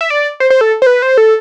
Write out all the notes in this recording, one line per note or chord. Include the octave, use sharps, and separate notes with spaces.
E5
D5
C5
C5
A4
C5
B4
C5
A4